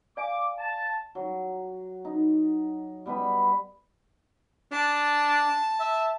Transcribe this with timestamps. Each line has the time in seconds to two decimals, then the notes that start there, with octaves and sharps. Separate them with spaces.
0.17 D5 F5 G#5 D6
0.58 A5
1.15 F#3
2.05 D#4
3.06 G3 B3 B4 B5
4.72 D4 A5
5.80 E5